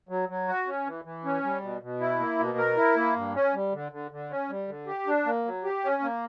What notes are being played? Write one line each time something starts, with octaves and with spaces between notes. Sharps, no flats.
F#3
F#3
F#4
C#4
E3
E3
C#4
G3
B2
B2
E4
A#3
B2
A#4
E4
A#3
G2
C#4
G3
D3
D3
D3
C#4
G3
D3
G4
D4
A#3
F#3
G4
C#4
A#3